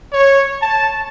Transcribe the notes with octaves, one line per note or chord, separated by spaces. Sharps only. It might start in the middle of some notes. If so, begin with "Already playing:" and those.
C#5
A5